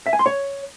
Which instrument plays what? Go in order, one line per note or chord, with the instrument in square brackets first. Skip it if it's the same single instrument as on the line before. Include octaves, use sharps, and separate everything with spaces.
[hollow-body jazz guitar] E5
G#5
C6
C#5